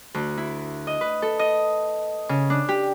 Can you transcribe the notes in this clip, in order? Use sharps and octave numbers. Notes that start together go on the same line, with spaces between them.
D2
E4
D#5
B4
A4
D#5
C#3
D4
G4